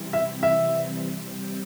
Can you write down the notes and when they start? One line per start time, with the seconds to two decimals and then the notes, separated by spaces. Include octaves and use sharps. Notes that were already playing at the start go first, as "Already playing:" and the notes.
Already playing: C3 E3 G3 C4 E4
0.13 E5
0.43 E5
1.00 C3 G3 C4